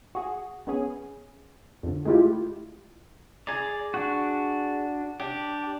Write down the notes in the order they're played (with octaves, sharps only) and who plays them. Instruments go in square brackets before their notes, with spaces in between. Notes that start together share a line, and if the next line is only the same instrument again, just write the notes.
[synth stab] F#4 G#4
B3 C#4 G#4
F2 D3
G#3 A3 E4 F4 G4
[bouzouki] G#4 A#5 [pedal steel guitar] D5
[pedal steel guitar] D4 F#4
[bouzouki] D4 [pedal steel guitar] G4